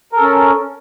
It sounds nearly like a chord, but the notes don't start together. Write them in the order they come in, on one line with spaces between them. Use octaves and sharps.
A#4 A4 C#4